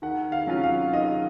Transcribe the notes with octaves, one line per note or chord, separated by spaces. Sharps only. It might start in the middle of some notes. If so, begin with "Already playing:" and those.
D#3 F#5
F5
F#3 C#4 F4
F5
D#3 D#5